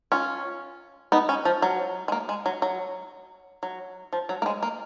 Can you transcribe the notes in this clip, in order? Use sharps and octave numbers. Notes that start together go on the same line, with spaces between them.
C#4 F4
B3 D#4
C#4
F3
F#3
G#3
A#3
G#3
F#3
F#3
F#3
F3
F#3
A#3
G#3
A#3